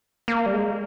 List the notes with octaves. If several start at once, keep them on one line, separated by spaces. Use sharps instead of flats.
A#3
G3
G#3